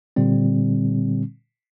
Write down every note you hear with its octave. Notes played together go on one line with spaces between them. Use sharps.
A#2 D3 G3 C4